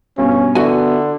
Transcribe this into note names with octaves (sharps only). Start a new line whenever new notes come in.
G2 B2 C#4
D3 B3 E4 F#4 G#5